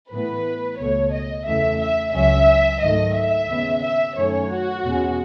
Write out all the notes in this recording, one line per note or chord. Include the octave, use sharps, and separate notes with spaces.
A2 E3 B3 B4
C#2 B2 A3 C#5
D#5
E2 C#3 E3 A3 E5
E5
C#2 C#3 F#3 C#4 E5
G#2 D#3 F#3 A3 D#5
E5
D#2 C#3 G#3 B3
E5
F#2 D#3 A3 C#4 C#5
F#4
E2 B2 G#3 C#4